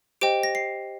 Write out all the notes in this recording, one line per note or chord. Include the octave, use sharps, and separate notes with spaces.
G4 C5 D#5 G5 D7
A#6
C7